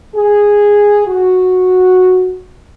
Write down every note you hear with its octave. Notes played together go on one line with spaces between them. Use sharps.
G#4
F#4